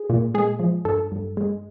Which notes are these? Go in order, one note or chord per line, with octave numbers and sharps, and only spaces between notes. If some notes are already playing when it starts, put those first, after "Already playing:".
Already playing: G#4
A#2
G#3 G#4
F3
G2 A4
G2
G#3